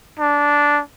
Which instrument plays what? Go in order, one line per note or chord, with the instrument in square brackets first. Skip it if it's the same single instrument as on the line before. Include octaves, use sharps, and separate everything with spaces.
[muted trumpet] D4